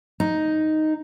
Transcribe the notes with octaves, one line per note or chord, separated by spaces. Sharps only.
D#4